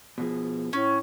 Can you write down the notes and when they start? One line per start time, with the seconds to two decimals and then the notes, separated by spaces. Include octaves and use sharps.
0.18 B2 F3 G#4
0.73 A2 C#4